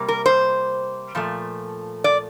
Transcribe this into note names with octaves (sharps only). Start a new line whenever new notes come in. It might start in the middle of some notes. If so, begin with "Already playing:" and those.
Already playing: C3 G3 A#3
A#4
C5
A#2 F3 A3
D5